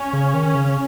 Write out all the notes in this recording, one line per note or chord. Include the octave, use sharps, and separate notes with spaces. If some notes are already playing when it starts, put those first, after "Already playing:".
Already playing: C#4
C#3
D#3
C#3